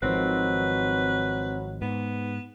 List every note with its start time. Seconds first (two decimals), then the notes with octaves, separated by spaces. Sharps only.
0.03 G#1 D#3 F3 F#3 C4 B4 C5
1.82 G#2 B3